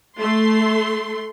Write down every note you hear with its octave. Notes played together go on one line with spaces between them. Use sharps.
A3 C6